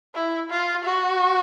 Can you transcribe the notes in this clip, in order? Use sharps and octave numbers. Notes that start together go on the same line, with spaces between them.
E4
F4
F#4